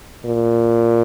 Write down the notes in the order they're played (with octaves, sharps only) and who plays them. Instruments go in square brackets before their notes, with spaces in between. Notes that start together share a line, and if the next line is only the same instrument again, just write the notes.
[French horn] A#2